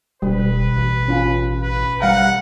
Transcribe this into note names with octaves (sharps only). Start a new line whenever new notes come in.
E1 B2 G3 B4
A1
C#4 F4
B4
G3 F5 F#5 A#5